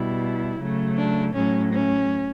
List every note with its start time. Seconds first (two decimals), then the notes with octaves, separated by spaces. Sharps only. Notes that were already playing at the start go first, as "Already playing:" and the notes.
Already playing: B2 G3 E4
0.59 C#3 F#3 A3
0.96 D4
1.34 A2 F#3 A3 C#4
1.72 C#4